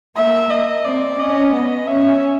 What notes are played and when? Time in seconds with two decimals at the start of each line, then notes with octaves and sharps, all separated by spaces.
0.16 A#3 E5
0.50 D#5
0.84 C4 D5
1.18 C#4 D#5
1.53 B3 D#5
1.87 C#4 E5